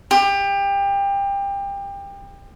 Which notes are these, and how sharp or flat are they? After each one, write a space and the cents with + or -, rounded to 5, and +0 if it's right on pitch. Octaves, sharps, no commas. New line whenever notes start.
G4 +25